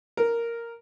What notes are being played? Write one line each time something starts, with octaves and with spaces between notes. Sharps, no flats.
A#4